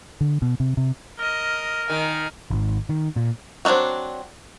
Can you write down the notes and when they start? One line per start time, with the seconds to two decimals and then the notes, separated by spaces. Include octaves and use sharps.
0.21 D3
0.42 B2
0.60 C3
0.77 C3
1.19 A#4 D#5 F6
1.90 D#3 G#5 A#5
2.51 G#1
2.89 D#3
3.16 A#2
3.65 F#3 C4 D4 D#4 F#4